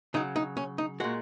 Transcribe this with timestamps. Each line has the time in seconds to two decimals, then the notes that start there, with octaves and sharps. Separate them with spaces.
0.14 C#3 F#3 D#4
0.36 D#4
0.57 C#4
0.78 D#4
1.00 A#2 G#3 F#4